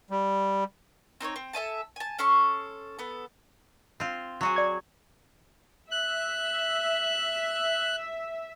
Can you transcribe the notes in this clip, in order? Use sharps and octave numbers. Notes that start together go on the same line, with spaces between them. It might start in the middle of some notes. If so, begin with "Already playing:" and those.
G3
C4 D#4 C5 C#5
C4
A4 E5 G#5 A5
G#5 A5
C#4 A4 C6 C#6
B3 A4
C4 F4
F#3 F#4 G#4
D5 C#6 G#6
E5 F#6